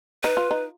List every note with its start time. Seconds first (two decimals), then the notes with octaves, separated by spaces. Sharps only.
0.23 D#4 B4
0.37 F4
0.51 D#4